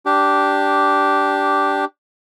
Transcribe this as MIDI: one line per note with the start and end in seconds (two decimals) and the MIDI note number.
0.06 1.85 62
0.06 1.85 67